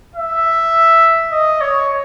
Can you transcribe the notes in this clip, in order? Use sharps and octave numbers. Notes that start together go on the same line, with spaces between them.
E5
D#5
C#5